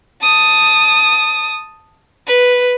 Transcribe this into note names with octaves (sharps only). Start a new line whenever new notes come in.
A5 D#6
B4